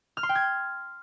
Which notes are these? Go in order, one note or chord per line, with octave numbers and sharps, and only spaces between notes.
F6
C6
G5
G#6